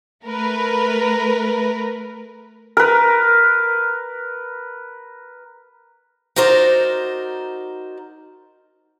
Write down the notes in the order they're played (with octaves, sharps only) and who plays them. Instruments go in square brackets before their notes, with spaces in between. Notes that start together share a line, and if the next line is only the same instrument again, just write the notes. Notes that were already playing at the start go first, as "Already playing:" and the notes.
[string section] A3 A#4 B4
[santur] A#4 B4
[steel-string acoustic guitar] D#4 F#4 A#4 C5 D5